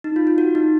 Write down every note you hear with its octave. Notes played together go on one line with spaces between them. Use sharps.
D#4
F4
F4
F#4
D#4